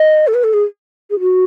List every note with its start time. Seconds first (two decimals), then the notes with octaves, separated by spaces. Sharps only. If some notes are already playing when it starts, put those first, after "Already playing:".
Already playing: D#5
0.27 A4
0.34 B4
0.44 A4
0.53 G#4
1.11 G#4
1.20 F#4